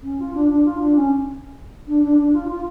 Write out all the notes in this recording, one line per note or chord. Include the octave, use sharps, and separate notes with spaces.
C#4
F4
D4
D4
F4
D4
C#4
D4
D4
D4
F4
F4